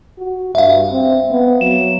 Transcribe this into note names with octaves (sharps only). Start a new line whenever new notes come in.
F#4
G2 E5 F5
C4
B3
F#3 E7